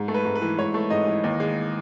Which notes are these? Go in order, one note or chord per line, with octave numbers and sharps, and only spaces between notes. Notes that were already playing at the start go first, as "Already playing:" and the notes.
Already playing: G#2
A3
B4
G#2
B4
E3
G#2 C#5
A3
G#2 D#5
E3
D#2
G#3